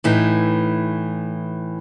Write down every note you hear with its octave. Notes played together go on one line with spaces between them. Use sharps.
A2 E3 A3 D#4